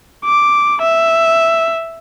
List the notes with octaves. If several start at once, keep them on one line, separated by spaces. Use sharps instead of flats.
D6
E5